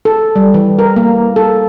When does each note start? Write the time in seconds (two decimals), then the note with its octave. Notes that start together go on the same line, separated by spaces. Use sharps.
0.05 A4
0.36 G3
0.54 E3
0.79 A#4
0.96 A#3
1.36 A4